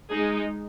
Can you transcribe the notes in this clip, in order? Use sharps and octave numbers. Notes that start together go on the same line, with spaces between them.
G#3 D#4 G#4